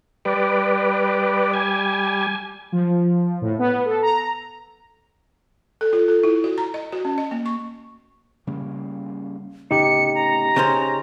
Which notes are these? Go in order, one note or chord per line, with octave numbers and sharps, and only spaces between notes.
G3 B4 D5
G#5
F3
A2
B3
A4
A#5
A4
F4
A4
E4
F#4
A#5
D#5
F#4
C#4
D#5
A#3
C#6
C#3 G3 A#3
D1 C#3 B3 D#4 G4 C#7
A#5
C#3 C#4 C5